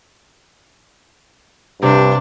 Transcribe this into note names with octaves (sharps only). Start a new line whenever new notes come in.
G2 C3 D4